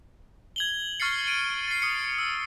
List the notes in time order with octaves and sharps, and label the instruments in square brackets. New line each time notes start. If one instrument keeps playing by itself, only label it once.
[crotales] G#6 F#7 G7
C#6 F6 A6 C7 C#7
D7 D#7
A6 C7
D#6 C7 C#7
E6